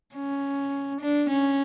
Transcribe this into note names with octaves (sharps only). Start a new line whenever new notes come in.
C#4
D4
C#4